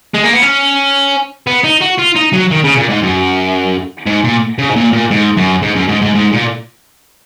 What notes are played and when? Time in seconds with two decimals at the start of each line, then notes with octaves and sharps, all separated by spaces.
0.15 G#3
0.24 A#3
0.33 B3
0.42 C#4
1.47 B3
1.64 D#4
1.81 F#4
1.99 F4
2.16 D#4
2.33 F#3
2.51 D#3
2.64 C#3
2.77 A#2
2.89 G#2
3.03 F#2
4.07 G#2
4.24 A#2
4.59 C#3
4.70 G#2
4.76 A#2
4.93 A#2
5.11 G#2
5.37 F#2
5.62 G#2
5.76 F#2
5.89 G#2
6.02 G#2
6.15 G#2
6.32 A#2